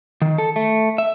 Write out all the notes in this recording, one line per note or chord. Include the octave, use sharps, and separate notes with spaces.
D#3
A4
A3
E5